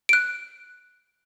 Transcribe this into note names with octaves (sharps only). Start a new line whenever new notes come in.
F#6 D7